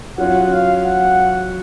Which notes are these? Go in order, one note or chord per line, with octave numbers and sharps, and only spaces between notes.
F#3 C#4 F4 F#5
F5
F#5